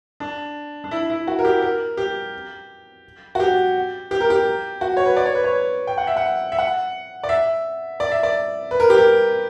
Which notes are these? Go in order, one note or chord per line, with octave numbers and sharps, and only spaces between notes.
D4
D4
E4
E4
F#4
A#4
G4
A#4
G4
F#4
G4
G4
A#4
G4
F#4
C#5
B4
D5
C#5
B4
C#5
G5
F#5
E5
F#5
E5
F#5
D5
E5
D5
E5
D5
B4
A#4
G4
A#4